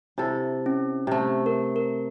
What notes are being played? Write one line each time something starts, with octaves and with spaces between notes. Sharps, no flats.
C3 E4 A4
C#4
C3 A3
A#4
A#4